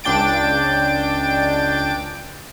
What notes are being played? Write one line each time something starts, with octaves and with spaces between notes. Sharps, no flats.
C#2 D4 G5 A6 D7